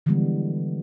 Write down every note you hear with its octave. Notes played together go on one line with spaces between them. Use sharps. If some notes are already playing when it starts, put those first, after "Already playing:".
D3 E3 F3 G3 G#3 B3